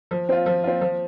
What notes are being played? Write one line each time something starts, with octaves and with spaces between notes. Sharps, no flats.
F3
C4 F4
F3
C4 F4
F3